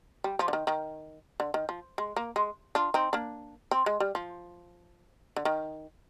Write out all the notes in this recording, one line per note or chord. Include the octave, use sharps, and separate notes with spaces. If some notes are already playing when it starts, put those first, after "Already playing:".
G3
F3
D3
D#3
D#3
D3
D#3
F3
G#3
A#3
G#3
D4 F4
C4 D#4
A#3 D4
C4
G#3
G3
F3
D3
D#3